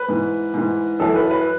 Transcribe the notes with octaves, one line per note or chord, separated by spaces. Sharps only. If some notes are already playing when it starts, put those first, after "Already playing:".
Already playing: B4
G#2 E3
G#2 E3
F#2 E3 A4
B4
B4